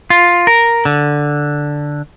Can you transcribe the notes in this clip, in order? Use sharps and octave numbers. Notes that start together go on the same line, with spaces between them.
F4
A#4
D3